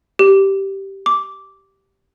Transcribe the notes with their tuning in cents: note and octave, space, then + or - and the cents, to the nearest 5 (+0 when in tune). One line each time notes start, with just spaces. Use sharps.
G4 -10
D6 -10